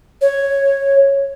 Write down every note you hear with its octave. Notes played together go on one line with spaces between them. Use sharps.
C#5